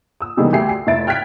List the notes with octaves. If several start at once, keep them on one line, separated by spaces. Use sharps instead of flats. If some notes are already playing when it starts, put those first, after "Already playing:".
D#6 E6
C3 D#3 E3 G3 G#3 B3
D2 G4 G#4 E5 C7
C7
F1 E4 E5 A6 D7
G5 F6 F#6 G#6 B6 D7